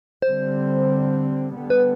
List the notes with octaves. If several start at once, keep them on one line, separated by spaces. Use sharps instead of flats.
D3 G3 C4 C5
D3 G3 B3
B4